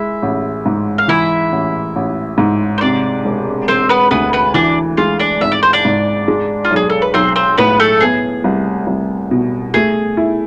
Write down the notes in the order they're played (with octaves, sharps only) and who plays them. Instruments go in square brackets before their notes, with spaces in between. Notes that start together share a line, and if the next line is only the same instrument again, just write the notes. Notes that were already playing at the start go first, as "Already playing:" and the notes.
Already playing: [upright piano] G#3 [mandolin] E4 E5
[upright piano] A1
G#2
[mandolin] F5
[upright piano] E3 [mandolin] E4 E5
[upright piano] A1
A1
G#2
[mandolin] C5
[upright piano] C3 [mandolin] D4 D5
[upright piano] E1
[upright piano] E1 [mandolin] C4 C5
[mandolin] B3 B4
[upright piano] D2 [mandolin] B3 B4
[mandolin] B3 B4
[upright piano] E3 [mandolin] D4 D5
[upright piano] G#3 [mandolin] F4 F5
[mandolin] D4 D5
[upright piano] G#1 [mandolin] E5
[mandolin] D5
C5
D4 D5
[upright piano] G#2
G#3
[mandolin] F4
[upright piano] B1
[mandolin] G#4
A4
B4
[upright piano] B1 [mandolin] C4 C5
[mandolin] C4 C5
[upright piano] A2 [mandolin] B3 B4
[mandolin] A3 A4
[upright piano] B3 [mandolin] G#4
[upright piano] C2
C2
B2
[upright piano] A3 [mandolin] G#4
[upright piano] E4